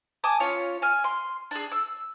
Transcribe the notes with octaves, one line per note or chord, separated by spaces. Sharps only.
G#5 A5 D6 D#6
C#4 F4 C#5
G#5 F6
C6
D4 G#4
E6